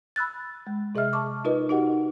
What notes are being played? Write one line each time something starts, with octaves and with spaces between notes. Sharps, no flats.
B5 E6 F#6 A6
G#3
C3 G#4 D#5 E5 F6
A5 C#6 D6
D#4 F4 A#4 B4 D#5
D#4 F#4 G4 A#4 D#5 F#5